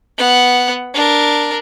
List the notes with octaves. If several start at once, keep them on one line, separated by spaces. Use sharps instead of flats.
B3 F#5
D4 A#4